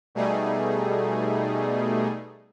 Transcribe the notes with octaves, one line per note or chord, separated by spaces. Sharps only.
B2 G3 A3 D#4 G#4